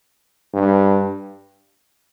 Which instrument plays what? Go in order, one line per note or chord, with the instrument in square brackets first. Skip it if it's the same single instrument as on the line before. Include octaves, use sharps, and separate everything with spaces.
[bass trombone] G2